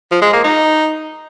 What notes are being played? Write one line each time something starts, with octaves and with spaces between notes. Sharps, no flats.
F3
G#3
A#3
D#4